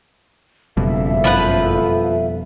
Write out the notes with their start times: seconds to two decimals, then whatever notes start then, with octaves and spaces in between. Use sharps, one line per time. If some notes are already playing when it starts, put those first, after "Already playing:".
0.77 F#1 F2 B2 G3 A4 E5 F5
1.24 F3 B4 F#5